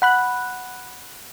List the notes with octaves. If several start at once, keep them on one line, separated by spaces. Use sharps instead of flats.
F#5 B5 F#6